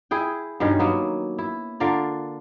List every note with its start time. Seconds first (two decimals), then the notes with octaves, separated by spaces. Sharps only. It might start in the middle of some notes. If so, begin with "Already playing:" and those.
0.11 E4 G#4 G5
0.60 G2 B2 D#3 C#4
0.79 F#3 A#3 B3
1.38 E4
1.80 D3 F4 A#4 D5